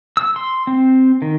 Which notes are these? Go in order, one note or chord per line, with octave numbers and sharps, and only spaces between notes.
E6
C6
C4
D#3